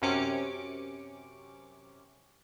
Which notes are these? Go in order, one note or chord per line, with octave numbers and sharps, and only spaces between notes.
F#2 C3 C#4 D6 C#7